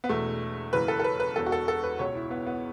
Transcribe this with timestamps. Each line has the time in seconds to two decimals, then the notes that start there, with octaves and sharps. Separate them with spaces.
0.04 B3
0.09 E1 E2 B2 A3
0.73 F#1 F#2 C#3 E3 B4
0.88 A4
0.99 A4
1.04 B4
1.20 B4
1.36 E1 E2 B2 A4
1.46 F#4
1.52 A4
1.68 A4
1.83 B4
1.99 C#2 B2 C#5
2.15 E4
2.31 B3
2.46 B3